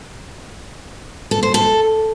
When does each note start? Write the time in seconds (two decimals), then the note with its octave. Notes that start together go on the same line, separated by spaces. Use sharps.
1.31 A4
1.43 C5
1.54 A4